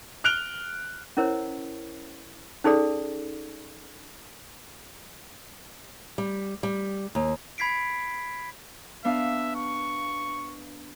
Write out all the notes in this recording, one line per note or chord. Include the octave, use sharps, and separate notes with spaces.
F6 F#6 D7 F7 G7
C#4 E4 A#4 C5 C#5
C#4 D#4 G#4 A4 D5
G3
G3
D#2
B5 G#6 B6 C7 D7
B3 D4 E5 F5
C#6